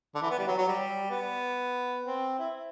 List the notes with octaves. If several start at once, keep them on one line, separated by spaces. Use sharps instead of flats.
D3
E3
B3
G3
F#3
F#3
G3
B3
C4
E4